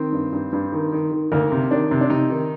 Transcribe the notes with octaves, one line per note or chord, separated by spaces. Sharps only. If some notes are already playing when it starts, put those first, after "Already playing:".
Already playing: D#3 C4
G2
G2
G2
D#3
D#3
D#3
D2 A#3 A#4
C3
D#3 D4
C3
D4
C3 D#4
D#3